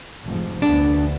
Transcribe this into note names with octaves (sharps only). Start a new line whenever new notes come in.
F1 G#2 F3
D2 B3 D4